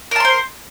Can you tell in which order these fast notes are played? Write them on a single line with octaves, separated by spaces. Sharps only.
A#4 A5 C6 C5